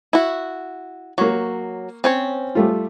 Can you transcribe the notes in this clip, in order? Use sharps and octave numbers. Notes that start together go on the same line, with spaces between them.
E4 F#4
F#3 A#3 C#6
C4 C#4 C#5
G3 A3 F4